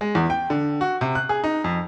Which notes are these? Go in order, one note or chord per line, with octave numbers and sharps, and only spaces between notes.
G#3
E2
G5
D3
F#4
C3
F#6
G#4
D#4
F2